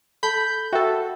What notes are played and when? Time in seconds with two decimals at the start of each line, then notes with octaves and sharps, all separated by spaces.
0.23 A4 A5 B5 G6
0.72 F#4 A4 E5 G5 C#6